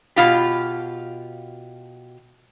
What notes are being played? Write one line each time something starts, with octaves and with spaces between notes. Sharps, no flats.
B2 F4 G4